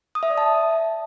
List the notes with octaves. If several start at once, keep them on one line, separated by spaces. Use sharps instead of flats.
D#6
E5
D5
A5